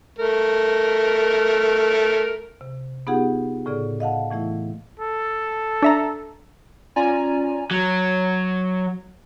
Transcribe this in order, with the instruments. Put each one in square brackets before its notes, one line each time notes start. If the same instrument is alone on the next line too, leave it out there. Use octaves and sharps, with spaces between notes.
[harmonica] A3 A#4
[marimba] C3
B3 D#4 F4 G4 G#4 F#5
A2 C#3 G#4 D5
D#5 F5 F#5 A5
A2 E3 A3 E4
[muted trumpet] A4
[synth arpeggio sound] D4 E5 A#5
[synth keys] C#4 F4 D5 G#5 A#5
[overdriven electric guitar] F#3